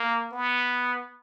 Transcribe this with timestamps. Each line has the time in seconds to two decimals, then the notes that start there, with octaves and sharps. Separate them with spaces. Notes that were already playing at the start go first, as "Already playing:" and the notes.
Already playing: A#3
0.32 B3